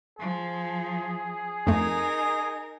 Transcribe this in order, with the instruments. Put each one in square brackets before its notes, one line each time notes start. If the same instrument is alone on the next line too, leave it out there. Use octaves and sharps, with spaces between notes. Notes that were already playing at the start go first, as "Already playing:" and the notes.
[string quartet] F3 [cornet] G#4
[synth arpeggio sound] F2 A3 [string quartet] D#4 A#4 [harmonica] G#5 D#6